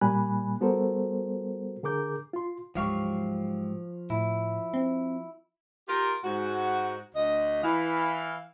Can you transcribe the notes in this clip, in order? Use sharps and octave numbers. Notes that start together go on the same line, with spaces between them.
A#2 G3 A#3 G#5 B5 F#6
G3 B3 F#4 A4 A#4 C5
D3 G#4 A#4 D6 G6
F4 C6
D1 G#2 F3 F#3 G4 F5 C#6
A2 E4
C4
F4 G4 A#4
G#2 F#4
D2 D#5
E3 F5